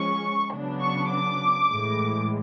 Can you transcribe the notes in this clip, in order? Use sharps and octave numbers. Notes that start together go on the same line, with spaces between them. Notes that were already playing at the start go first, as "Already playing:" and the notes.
Already playing: F3 G#3 C#4 C#6
C#3 F#3 B3 D4
C#6
D6
A2 E3 G#3